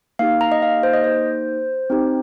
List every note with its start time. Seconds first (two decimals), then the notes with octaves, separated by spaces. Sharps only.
0.19 A#3 D#4 G4 F5
0.41 A#5
0.52 D#5
0.62 F5
0.83 C5
0.94 D#5
1.04 C5
1.90 C4 D#4 G4